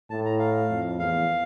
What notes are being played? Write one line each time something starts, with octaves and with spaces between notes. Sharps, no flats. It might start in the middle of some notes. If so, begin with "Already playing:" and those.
A2 A5
A#5
F5
F2
E2 F5